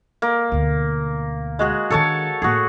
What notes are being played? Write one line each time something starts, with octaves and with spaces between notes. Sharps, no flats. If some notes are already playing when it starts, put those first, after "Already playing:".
A#3
D2 B2
G#3 F#4 G#4
D#3 D4 A4 C#5 A5
A2 A#3 F#4 G#4